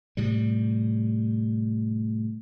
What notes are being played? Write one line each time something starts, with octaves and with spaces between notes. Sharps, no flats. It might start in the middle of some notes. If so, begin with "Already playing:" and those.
A2 C3 G3